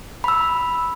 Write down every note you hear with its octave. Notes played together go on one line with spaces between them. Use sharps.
B5 E6